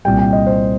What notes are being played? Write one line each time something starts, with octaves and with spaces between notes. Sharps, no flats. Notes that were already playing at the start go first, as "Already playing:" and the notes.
C2 A#2 G3 G5
G5
D#5
C5